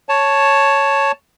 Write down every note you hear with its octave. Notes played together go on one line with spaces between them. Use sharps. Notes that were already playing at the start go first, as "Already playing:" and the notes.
C#5 A5